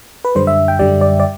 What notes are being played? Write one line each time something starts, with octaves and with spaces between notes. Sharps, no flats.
B4
F#2 D3 G3 C5
E5
G5
F#2 D3 G3 D5
D5
D5